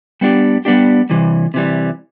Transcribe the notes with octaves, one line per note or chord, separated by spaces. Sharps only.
G3 B3 D4 G4
G3 B3 D4 G4
C3 E3 G3
C3 E3 G3